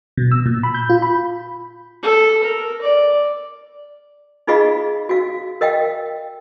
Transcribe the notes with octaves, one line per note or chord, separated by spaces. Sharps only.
B2
E6
A#2
B5
G6
F4
B5
A4
A#4
D5
D#4 F4 G#4 D#5 F5 B5
F#4 F5
A#4 D#5 F5 G5